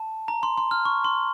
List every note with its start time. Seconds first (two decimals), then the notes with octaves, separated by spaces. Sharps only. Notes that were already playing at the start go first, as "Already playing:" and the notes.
Already playing: A5
0.28 A#5
0.43 C6
0.58 C6
0.71 F6
0.85 C#6
1.04 C6